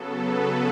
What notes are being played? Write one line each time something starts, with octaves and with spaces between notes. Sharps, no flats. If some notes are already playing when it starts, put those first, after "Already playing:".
Already playing: C#3 F#3 B3 A4
B4